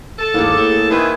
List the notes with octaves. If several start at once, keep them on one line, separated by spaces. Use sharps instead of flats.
A4
G1 D#2 A2 A#3 G#4
A2
D#3 E3 E4 G#4 C5